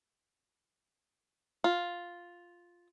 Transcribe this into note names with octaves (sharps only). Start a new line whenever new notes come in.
F4